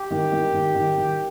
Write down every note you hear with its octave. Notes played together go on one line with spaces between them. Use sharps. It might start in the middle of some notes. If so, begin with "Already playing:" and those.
Already playing: G4
D#3
D#3
D#3
D#3
D#3